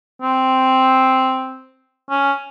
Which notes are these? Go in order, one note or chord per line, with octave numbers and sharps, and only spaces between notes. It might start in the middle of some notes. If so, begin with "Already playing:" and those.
C4
C#4